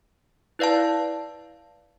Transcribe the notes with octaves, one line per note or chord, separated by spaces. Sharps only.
E4 B4 D5 F5 A5